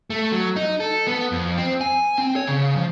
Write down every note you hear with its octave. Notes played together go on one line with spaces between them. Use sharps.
A3
F#3
D#4
A4
B3
F2
C4
G#5
C4
C#5
C#3
F3